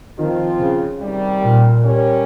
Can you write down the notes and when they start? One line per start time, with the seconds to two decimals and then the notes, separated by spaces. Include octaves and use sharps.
0.17 D#3 F3 C4 F4
0.59 C#3
0.99 C3 D#3 G3
1.41 A#2
1.82 G3 C#4 G4 A#4 C#5